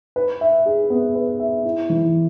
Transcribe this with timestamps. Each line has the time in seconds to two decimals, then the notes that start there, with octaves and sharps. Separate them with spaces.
0.16 B4
0.41 E5
0.66 G#4
0.90 B3
1.16 B4
1.40 E5
1.64 E4
1.90 E3